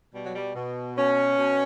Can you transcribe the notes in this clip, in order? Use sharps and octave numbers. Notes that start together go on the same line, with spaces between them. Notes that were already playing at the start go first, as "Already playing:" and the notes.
B2 G3
F#3
G3
B2
B2 C#4
B2